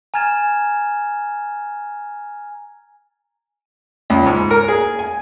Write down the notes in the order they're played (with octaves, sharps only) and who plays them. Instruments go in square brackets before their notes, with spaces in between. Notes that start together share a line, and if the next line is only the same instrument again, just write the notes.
[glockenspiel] G#5 A#5 F6 G#6 A6 E7
[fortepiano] C#2
G#2
A#4
G#4
G#5